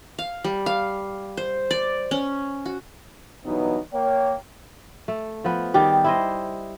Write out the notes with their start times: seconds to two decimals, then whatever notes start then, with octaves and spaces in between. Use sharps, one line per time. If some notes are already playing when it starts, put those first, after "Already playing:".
0.19 F5
0.44 G3
0.66 F5
1.37 C5
1.71 D5
2.11 C#4
2.66 F#4
3.45 G2 B2 E3 F#3 B3 D#4
3.93 A#3 C#5 G5
5.08 A3
5.44 F3 B3
5.74 D#3 G3 G4 G#4
6.04 E4 C5 D#5